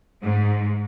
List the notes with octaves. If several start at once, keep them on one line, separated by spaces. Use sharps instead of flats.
G#2